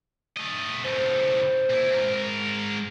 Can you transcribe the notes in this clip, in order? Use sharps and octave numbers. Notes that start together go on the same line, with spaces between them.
A3 D#5
C#2 A2 C5
A#2 E4
G#2 A#4